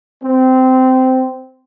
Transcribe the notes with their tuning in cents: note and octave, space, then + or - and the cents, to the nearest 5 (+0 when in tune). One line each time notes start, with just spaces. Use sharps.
C4 -15